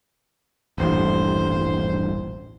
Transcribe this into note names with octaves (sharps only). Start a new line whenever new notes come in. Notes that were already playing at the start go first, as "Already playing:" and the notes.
D#1 A1 G2 C5